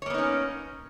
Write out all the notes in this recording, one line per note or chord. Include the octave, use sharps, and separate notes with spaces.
A#3 B3 C#4 D#4 C#5